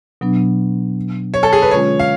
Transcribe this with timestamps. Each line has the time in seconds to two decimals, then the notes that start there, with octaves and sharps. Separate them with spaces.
0.21 B2 F#3 B3 D4
1.34 C#5
1.43 A4
1.53 G#4
1.62 B4
1.71 D3 G#3 C#4 F4 C#5
1.99 F5